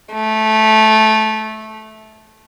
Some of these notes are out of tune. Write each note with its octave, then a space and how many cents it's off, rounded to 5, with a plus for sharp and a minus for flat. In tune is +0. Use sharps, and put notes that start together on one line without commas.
A3 -15